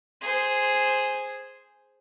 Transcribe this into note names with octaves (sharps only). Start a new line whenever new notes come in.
G#4 C5